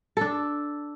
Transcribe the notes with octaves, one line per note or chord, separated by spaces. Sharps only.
D4 A4